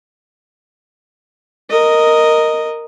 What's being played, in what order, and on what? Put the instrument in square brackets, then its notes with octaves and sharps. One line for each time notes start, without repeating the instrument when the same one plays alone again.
[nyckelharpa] A#4 D#5